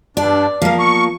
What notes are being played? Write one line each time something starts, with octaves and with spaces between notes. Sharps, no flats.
G2 D4 D5
F3 A#3 F5
C#6